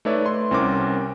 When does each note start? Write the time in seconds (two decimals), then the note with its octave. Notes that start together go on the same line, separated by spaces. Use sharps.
0.05 A3 D#4 B4 C#5 D5 E5
0.26 C6
0.51 C2 C4 C#4 A#4 D6